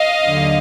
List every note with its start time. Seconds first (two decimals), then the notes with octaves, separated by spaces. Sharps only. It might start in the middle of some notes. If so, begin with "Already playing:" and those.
Already playing: D#5 F5
0.23 D#2 D3 F#3